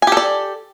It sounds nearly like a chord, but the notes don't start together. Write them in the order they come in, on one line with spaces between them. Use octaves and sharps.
G#5 G4 A4 D5